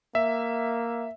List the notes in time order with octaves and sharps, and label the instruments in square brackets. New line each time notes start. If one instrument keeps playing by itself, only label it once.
[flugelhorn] A#3 [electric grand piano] E5